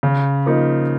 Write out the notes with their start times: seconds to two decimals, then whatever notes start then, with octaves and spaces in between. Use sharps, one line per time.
0.03 C#3
0.46 F3 A#3 D#4